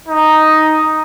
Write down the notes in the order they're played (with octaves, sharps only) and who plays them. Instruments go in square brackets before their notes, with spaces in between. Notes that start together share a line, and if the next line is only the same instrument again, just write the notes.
[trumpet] D#4